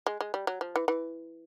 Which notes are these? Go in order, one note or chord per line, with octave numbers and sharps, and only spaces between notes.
G#3
G#3
G3
F#3
F3
E3
E3